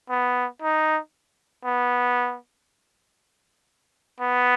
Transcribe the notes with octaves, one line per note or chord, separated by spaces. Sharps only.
B3
D#4
B3
B3